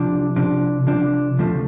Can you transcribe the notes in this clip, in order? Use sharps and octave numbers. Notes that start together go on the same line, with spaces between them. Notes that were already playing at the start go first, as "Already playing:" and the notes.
Already playing: C2 C3 F3 D4
C2 C3 F3 D4
C2 C3 F3 D4
D2 C3 F3 A3